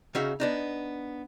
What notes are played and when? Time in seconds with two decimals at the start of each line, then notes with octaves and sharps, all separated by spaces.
0.15 C#3 C#4 D#4 F#4 E5 F5
0.40 B3 D4 D#4